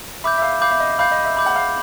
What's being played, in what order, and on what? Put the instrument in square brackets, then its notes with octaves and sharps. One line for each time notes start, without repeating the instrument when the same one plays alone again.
[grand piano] E5 [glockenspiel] B5 D6 G6
[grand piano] E5
F5
[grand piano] F5 [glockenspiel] B5 D6 G6
[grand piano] E5
D#5
E5
[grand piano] F5 [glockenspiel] B5 D6 G6
[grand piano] D#5
E5
[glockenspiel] B5 D6 G6
[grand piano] F#5
F5